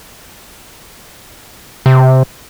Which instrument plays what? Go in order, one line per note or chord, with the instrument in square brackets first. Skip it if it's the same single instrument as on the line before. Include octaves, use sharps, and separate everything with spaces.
[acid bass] C3